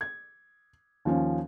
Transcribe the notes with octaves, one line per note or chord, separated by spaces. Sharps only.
G#6
D#2 F3 C#4